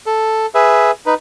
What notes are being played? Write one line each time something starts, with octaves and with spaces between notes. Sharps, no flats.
A4
G#4 B4 E5
D#4 B4